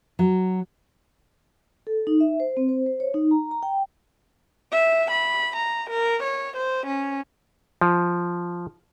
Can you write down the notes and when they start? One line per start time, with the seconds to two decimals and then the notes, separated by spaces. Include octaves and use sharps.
0.19 F#3
1.87 A4
2.07 D#4
2.20 E5
2.40 C5
2.57 C4
2.69 C5
2.86 C5
3.00 C#5
3.14 D#4
3.31 A#5
3.51 A#5
3.63 G5
4.72 E5
5.11 B5
5.56 A#5
5.90 A#4
6.23 C#5
6.57 C5
6.86 C#4
7.81 F3